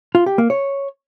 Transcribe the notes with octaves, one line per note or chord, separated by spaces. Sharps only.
F4
G4
A#3
C#5